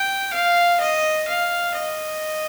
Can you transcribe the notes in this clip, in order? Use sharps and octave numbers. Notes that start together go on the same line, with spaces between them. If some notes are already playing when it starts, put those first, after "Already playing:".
Already playing: G5
F5
D#5
F5
D#5